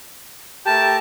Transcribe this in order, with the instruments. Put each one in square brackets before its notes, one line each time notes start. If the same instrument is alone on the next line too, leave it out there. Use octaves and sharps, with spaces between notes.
[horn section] A3 G4 A#4 [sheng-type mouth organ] A5